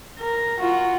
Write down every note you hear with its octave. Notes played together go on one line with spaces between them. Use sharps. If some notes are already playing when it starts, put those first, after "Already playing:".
A#4
F4 F#4